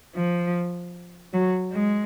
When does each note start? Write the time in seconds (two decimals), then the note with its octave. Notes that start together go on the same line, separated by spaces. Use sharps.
0.16 F3
1.34 F#3
1.73 G#3